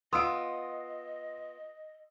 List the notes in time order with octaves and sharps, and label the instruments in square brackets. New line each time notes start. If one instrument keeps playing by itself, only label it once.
[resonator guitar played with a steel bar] B3 F4 [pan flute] D#5 [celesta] C6 [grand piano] D#6 E6 D7